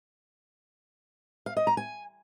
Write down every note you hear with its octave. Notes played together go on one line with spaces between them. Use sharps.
F5
D#5
A#5
G#5